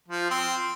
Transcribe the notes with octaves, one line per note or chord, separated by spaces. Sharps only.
F3
C4